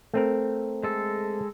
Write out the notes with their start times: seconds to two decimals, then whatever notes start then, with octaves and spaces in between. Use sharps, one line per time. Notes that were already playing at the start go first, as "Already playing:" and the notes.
0.14 A3 C4 A#4
0.83 G#3 A4